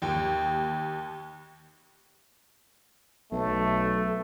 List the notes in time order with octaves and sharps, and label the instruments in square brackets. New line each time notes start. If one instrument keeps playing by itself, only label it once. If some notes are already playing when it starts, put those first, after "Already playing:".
[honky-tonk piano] D#2 G5
[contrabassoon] B1 [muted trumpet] A3